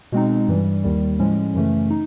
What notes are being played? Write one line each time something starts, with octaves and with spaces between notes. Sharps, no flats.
B2 G#3 C4 D#4
G2 E3 G3
D#2 D#3 G3
A2 F3 G#3 C#4
F#2 C#3 E3 A3 C#4
D#4